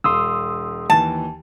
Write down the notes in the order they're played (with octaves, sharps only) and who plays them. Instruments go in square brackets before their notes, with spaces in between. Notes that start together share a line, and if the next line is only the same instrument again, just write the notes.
[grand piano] E1 F5 [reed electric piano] C6 D#6 E6
[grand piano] D#2 E3 [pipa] A5